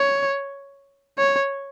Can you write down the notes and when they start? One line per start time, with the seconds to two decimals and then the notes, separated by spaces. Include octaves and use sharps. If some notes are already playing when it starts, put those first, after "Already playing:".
Already playing: C#5
1.18 C#5